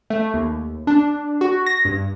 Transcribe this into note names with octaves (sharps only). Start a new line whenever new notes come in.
A3
D#2
D4
F#4
A#6
G2